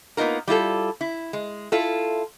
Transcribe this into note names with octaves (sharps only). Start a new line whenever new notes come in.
A#3 B3 D#4 F4 A#4
G3 E4 F4 A4
E4
G#3
E4 F4 A4